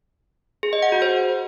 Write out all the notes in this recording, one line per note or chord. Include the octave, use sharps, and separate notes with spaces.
G#4
D#5
F#5
F#4
C5